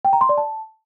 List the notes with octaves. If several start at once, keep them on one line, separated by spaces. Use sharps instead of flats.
G5
A#5
C6
D5
A5